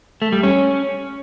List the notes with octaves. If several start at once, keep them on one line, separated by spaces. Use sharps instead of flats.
A3
G3
C#4